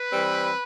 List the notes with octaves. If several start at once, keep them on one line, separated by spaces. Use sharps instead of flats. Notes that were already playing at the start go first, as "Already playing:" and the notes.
Already playing: B4
E3 G3 C4